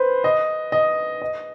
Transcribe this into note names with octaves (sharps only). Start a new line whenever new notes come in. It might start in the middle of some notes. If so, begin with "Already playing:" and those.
Already playing: B4 C5
D#5
D#5
D#5